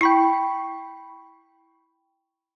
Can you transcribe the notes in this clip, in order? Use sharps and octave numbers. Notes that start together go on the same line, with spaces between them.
E4 G5 B5 C#6